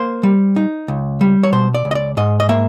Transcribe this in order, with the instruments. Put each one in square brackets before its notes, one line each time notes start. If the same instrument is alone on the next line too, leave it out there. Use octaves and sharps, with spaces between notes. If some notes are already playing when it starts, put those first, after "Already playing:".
Already playing: [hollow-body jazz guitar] A#3 C5
G3
D#4
C#2
G3
C#5
B2 C5
D5
C#2
D#5
D5
G#2 D#5
D#5
A#3 E5